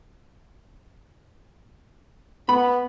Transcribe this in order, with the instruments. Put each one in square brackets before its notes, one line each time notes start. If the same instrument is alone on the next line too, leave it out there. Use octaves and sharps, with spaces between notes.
[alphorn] B3 [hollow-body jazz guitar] B5